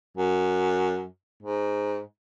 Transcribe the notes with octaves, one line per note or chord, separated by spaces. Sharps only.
F#2
G#2